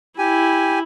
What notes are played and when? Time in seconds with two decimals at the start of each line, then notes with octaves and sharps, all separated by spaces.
0.18 E4 G4 G#5